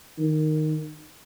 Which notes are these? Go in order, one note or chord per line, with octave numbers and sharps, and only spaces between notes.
D#3